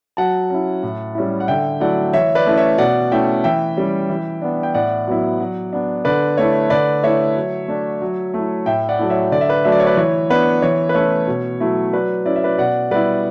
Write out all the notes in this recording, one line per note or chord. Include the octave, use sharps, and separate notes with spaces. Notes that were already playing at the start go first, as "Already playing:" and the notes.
F#3 F#5 A5
C#4 E4
A2
G3 C#4 E4
F#5
D3 E5 G5
F#3 A3 E4 D5 F#5
E3 C#5 E5
B4 D5
A3 C#4 E4
C#5 E5
B2 D5 F#5
A3 C#4 E4 E5 G5
E3 E5 G5
G3 C#4
E3
B3 D4
G5
A2 D5 F#5
F#3 B3 E4
F#3
B3 D4
D3 B4 D5
A3 E4 C#5
D3 B4 D5
A3 E4 C#5 E5
F#3
A3 D4
F#3
A3
E4
A2 E5 G5
D5 F#5
F#3 A3 E4
C#5 E5
D3 D5
E5
B4 D5
F#3 A3 D4 E5
D5
C#5
B4 D5
E3 C#5
B3 D4 B4
E3 C#5
B4
A3 C#4 E4 C#5
B2
F#3 A3 E4
F#3 B4 D5
C#4 E4 D5
E5
B4 D5
B2 D5 F#5
G3 B3 E4 B4 D5